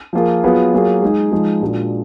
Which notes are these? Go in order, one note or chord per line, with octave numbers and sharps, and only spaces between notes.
F3 A#3 F4 G#4
F#3 B3 F4 G#4
F#3 A#3 F4 G#4
G#3 D#4 G#4
F3 G#3 D#4 G#4
A#2 G#3 D4 F#4